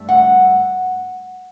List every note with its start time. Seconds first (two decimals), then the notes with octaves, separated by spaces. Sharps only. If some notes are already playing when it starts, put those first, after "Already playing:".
Already playing: G2 A3
0.09 F#5